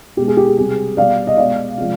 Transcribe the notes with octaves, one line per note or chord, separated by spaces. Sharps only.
B2 G#3 G4
G#4
G4
G#4
C3 G3 G#4
B2 G3 D5 F5
D#5
B2 G#3 D5 F5
C3 F3 G#3